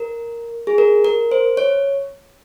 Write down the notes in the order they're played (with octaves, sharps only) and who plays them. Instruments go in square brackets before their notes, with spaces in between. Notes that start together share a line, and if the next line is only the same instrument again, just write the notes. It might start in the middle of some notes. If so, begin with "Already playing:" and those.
Already playing: [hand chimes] A#4
G#4
A#4
A#4
C5
C#5